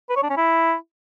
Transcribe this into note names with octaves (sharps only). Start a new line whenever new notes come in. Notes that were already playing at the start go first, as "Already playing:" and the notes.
B4
C#5
D4
C#4
E4